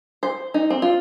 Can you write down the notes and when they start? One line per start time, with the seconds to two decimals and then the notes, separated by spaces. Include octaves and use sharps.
0.23 C5
0.54 D#4
0.70 C4
0.82 F4